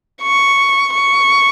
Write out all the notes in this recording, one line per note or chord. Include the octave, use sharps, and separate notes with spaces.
C#6
C#6